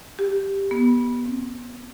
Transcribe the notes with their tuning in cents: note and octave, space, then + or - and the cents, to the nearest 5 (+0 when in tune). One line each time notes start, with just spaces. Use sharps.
G4 +5
B3 -25
C4 +25